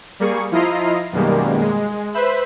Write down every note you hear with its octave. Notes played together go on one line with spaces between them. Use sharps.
G3 A#3 G#4 C#6
F3 E4 F4 D#5 A#5 C7
F#2 B2 D#3 G3 G#3 A#3
G#3
B4 C5 E5 B5